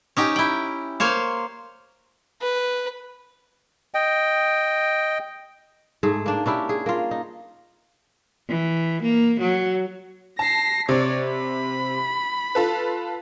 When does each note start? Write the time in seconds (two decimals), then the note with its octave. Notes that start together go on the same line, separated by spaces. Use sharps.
0.17 C#4 D#4 G4
0.36 E4 G5
1.00 A#3 C5 C#5 F5
2.41 B4
3.94 D#5 G5
6.03 G#2 A3 G#4
6.26 A#3 D4
6.46 C#4 D4 E4 G4
6.69 G#4
6.86 A#3 F4
7.11 D#4
8.49 E3
9.03 A#3
9.41 F#3
10.39 A5 A#6 C7
10.89 C3 C#5 D5
11.26 B5
12.55 F4 A4 B4